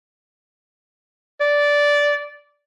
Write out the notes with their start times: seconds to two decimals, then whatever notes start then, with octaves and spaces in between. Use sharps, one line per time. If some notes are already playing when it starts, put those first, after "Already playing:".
1.41 D5